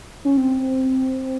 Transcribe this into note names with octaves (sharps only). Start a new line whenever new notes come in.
C#4
C4